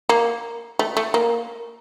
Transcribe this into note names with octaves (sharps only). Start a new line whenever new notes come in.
A#3
A3
A3
A#3